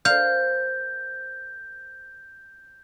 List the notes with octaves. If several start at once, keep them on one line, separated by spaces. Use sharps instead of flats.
A#4 C5 F5 G6